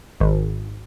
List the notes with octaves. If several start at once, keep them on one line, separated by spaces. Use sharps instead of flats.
G#1